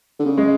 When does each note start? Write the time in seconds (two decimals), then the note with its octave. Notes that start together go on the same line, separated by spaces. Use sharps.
0.19 D3
0.25 C#3
0.38 G#3